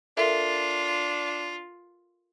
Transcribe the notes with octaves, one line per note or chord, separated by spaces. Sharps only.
D4 F4 A4 A#4 E5